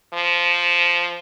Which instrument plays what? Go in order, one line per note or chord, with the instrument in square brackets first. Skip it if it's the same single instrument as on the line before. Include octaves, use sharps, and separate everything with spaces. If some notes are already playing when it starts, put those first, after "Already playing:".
[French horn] F3